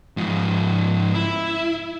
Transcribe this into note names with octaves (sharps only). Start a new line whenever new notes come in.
G#2 F3
E4